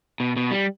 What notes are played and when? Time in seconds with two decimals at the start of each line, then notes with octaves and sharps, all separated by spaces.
0.20 B2
0.36 B2
0.51 G3